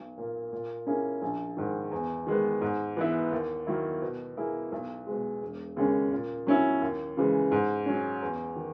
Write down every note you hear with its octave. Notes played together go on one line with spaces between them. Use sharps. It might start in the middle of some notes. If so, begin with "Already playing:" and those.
Already playing: B1
A#2 A#3
A#2
A#3 C#4 E4 G#4
A#1
G#2 D#3
E2
D#3 G#3 B3
G#2
E3 B3 E4
D#2
D#3 F#3 A#3 E4
B2
A#3 E4 G#4
B1
B2 G#3
E1
D#2 C#3 G#3 C#4
A#2
F#3 C#4 E4
D#2
C#3 E3 G#3
G#2
F#3 C#4
E2
D#3